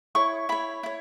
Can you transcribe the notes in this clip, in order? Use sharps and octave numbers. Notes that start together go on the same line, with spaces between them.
E4 C#5 C#6
E4 C#5 B5
E4 C#5